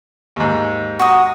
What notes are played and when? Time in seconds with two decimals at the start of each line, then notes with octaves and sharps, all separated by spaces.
0.36 D#2 G#2
0.99 F#4 A#5 D#6